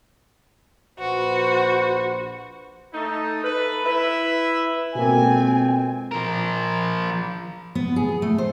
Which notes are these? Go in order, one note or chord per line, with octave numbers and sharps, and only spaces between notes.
A#1 F#4 B4 C5
A3 D#4
A4 B4
E4 B4 E5
F2 B2 G#3 A#3 C4 G#5
F3 A#4
B3
G#4
A3
C5